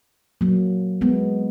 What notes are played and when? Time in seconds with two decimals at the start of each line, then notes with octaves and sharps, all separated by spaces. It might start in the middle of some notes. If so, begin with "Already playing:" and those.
0.41 F#3 A#3
1.01 G#3 B3